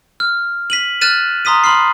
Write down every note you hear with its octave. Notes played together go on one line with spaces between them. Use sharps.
F6
B6 D#7 F#7
F6 F#6 A6 D#7 E7
A#5 C6 D#6 B6 D#7
B5 C6 F6 C7